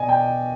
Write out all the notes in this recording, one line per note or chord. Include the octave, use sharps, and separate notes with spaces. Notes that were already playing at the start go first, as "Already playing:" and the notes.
Already playing: B2 D5 D#5 G#5
G5